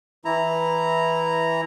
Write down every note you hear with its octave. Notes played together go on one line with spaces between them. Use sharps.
E3 E4 A#5